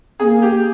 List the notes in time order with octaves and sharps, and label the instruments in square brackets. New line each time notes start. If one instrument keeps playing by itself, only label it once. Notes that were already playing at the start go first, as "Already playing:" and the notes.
[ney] A#3 C4 [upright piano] G#4
[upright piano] G4